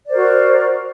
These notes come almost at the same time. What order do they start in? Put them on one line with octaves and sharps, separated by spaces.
D5 C5 A#4 F#4